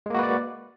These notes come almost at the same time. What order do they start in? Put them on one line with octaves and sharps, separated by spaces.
G#3 A#3 F#4 B4 D5